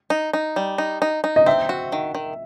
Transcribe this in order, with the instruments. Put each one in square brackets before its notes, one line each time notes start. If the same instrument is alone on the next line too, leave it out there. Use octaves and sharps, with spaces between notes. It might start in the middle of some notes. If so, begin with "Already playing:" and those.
[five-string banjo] D#4
D#4
G3
D#4
D#4
D#4
[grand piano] D#5
[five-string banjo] C4 [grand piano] E5
[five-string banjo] F#4
D#3
D#3